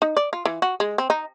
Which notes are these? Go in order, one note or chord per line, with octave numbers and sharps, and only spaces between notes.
D#4
D5
F4
E3
F#4
G#3
C4
D#4